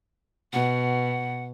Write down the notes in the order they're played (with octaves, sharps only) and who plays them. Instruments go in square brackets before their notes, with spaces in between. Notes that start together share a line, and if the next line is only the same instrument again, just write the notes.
[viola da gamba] B2 [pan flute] F#5